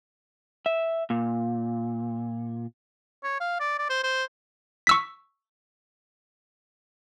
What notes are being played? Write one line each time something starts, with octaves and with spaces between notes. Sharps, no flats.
E5
A#2
C#5
F5
D5
D5
C5
C5
C#6 E6 B6